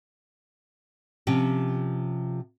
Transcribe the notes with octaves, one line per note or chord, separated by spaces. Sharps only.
C3 F3 C#4 G4